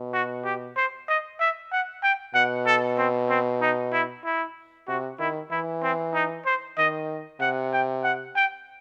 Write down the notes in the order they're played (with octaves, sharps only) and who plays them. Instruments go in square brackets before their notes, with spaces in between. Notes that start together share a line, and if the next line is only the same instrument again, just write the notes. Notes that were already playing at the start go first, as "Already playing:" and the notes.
Already playing: [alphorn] B2
[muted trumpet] F#4
G4
C5
D#5
E5
F#5
G5
[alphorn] B2 [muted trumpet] F#5
[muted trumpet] A4
C4
C4
D#4
E4
E4
[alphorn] C3 [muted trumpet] F#4
[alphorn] D#3 [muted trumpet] E4
[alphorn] E3 [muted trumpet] E4
[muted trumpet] C4
D#4
C5
[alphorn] D#3 [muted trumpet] D#5
[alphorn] C3 [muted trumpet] F#5
[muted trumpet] G5
F#5
G5